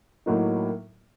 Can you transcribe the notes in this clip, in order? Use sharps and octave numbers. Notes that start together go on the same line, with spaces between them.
A2 F#3 A#3 D#4